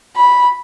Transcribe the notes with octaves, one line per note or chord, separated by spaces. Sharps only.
B5